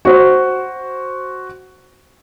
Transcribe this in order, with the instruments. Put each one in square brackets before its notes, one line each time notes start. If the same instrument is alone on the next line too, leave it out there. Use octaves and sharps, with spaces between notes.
[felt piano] F#4 C5